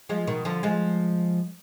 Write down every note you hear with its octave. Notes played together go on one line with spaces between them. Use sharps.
F3 G#3
B2 D#3
D3 F3
F3 G#3